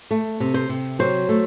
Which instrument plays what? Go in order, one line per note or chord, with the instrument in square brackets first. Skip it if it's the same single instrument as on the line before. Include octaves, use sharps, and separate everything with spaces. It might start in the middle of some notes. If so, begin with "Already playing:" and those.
[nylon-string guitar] A3
C3
C5
C3
F#3 C5
A3